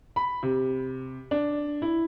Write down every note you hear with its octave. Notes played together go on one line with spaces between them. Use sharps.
B5
C3
D4
E4